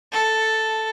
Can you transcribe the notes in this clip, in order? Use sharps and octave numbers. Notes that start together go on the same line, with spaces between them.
A4